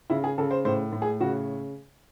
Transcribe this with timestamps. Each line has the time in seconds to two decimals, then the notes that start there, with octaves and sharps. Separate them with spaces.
0.10 C#3 E4
0.24 G#4
0.38 C#3 A4
0.51 C5
0.65 A2 C5
0.92 A2
1.02 G#4
1.20 C#3 F#4